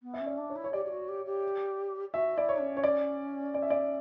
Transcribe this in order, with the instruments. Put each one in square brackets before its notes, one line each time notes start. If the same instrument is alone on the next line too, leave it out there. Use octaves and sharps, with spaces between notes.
[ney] B3
[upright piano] E5
[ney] C#4
[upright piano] D5
[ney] D4
[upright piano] C#5
[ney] E4
[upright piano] C#5
[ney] G4 [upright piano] D5
[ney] G4
F#4
G4
G4
[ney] F#4 [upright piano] E5
[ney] E4 [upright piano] D5
[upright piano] C#5
[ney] C#4
[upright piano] C#5
D5
D5
E5
D5